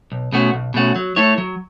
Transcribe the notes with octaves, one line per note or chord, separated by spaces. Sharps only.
B1
B2 A3 C#4 F#4
B1
B2 A3 C#4 F#4
F#3
A3 E4 A4 C#5
F#3